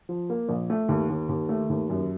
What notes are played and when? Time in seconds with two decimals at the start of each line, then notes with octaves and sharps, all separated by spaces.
0.09 F3
0.30 A#3
0.49 A#1
0.70 A3
0.89 D#2
1.09 D#2
1.29 D#2
1.49 A3
1.69 D#2
1.90 F#2